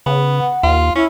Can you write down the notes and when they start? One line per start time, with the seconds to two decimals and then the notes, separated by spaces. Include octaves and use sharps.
0.06 C#3 B3
0.37 F#5
0.63 D#2 F4
0.95 C#4 E4